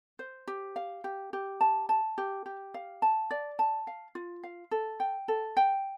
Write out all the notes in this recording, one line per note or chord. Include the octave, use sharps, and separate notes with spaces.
C5
G4
F5
G4
G4
A5
A5
G4
G4
F5
A5
D5
A5
F5
F4
F5
A4
G5
A4
G5